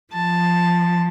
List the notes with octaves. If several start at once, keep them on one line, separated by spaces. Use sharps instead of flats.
F3 A5